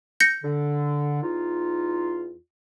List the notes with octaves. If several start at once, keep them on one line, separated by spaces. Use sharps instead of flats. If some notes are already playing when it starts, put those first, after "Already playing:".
G6 A#6 C#7
D3
E2 D#4 F4